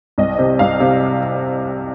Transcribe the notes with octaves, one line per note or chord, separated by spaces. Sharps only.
C2 D#5
C3
C2 F5
C3